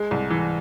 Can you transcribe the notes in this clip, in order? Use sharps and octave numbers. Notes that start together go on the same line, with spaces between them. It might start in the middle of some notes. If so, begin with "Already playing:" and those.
Already playing: G#3
C2
E3